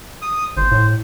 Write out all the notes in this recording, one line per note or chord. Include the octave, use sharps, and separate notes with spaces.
D#6
G1 C5
A2